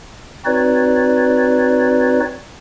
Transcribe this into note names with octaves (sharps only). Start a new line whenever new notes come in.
C4 D#4 F#4 B4 C#5 D5